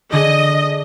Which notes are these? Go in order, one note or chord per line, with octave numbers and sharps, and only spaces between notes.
D3 G#4 D#5